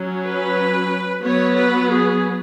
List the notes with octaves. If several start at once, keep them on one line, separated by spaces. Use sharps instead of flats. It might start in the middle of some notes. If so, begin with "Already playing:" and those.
Already playing: F#3 C#4
B4
F#3 B3 C#5
B4
G#4